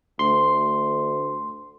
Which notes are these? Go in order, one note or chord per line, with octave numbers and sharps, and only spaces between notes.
D2 C6